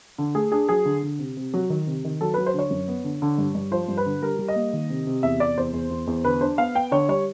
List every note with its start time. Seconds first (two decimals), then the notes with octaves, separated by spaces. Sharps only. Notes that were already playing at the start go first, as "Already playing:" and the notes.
0.18 D3
0.35 A3 G#4
0.52 D4 G#4
0.69 F#3 G#4
0.85 D3
1.03 D3
1.19 C3
1.37 C3
1.54 F#3
1.70 D#3
1.87 C3
2.04 D#3
2.21 F#3 A4
2.34 F#3 B4
2.46 C5
2.54 D3 C#5
2.71 F#2
2.88 B3
3.04 D3
3.22 D3
3.38 G2
3.55 G2
3.72 F3 C5
3.88 G2
3.97 B4
4.06 D3
4.22 G3 A#4
4.39 G3
4.48 D#5
4.56 A#3
4.73 D#3
4.90 C3
5.07 C3
5.23 E2 E5
5.40 C3 D5
5.58 E2 C5
5.73 E2
5.90 E2
6.07 E2
6.24 D3 B4
6.41 D4 C5
6.58 B3 F5
6.75 B3 G5
6.91 D3 C#5
7.09 G3 C#5